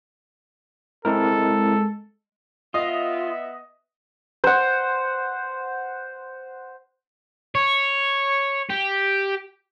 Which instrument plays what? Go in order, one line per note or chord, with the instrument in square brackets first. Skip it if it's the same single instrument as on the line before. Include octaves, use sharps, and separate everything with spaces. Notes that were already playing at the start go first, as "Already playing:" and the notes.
[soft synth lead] G#3 [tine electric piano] C4 E4 A#4 [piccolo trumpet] A4
[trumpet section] B3 E5 [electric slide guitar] F4 [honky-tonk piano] D#5 D#6
[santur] C5 F#5
[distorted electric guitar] C#5
G4